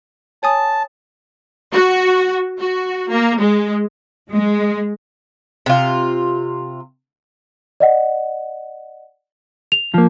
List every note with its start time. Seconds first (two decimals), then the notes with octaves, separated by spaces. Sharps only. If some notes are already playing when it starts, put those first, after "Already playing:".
0.43 C#5 G#5 A5 D#6
1.73 F#4
2.60 F#4
3.10 A#3
3.40 G#3
4.31 G#3
5.66 C3 F4
7.80 D5 D#5 F#5
9.72 F7
9.94 F3 A#3